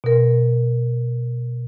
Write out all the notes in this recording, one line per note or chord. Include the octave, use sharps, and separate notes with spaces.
B2 A#4